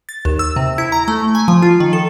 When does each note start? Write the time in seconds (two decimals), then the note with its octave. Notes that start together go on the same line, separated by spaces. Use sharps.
0.09 A6
0.25 D#2
0.39 E6
0.56 C3
0.78 E4
0.92 A#5
1.08 A3
1.35 G#5
1.48 F3
1.62 F4
1.80 D#3
1.93 A4